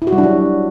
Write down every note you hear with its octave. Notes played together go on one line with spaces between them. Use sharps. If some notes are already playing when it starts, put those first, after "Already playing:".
E4
F#4
G3
D4
F#3